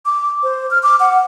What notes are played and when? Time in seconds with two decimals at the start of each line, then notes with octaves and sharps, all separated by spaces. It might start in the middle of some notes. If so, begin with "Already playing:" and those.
0.06 D6
0.43 C5
0.71 F6
0.83 D6
1.00 F#5